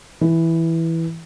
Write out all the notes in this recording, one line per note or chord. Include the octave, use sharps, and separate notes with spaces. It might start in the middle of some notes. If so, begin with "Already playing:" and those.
E3